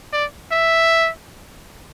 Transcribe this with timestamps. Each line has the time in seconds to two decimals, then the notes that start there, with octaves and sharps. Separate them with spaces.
0.13 D5
0.52 E5